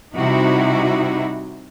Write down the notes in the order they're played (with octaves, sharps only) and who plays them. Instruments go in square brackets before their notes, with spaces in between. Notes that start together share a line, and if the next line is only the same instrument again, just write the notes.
[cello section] C3 G3 D#4 E4 F#4